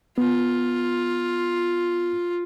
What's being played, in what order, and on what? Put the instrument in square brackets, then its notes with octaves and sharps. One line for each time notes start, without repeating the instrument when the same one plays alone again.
[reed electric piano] B3 [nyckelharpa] F4